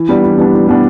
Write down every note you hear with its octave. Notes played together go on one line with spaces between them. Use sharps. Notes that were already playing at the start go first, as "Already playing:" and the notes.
Already playing: E3
G3 B3 D4
E3
G3 B3 D4
E3
G3 B3 D4